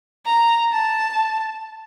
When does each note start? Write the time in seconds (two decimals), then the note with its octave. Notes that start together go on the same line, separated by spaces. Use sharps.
0.26 A#5
0.73 A5